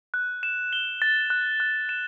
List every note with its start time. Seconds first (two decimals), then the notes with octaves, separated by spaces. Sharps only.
0.14 F#6
0.43 E7
0.73 G7
1.02 A6
1.30 F#6
1.60 F#6
1.89 E7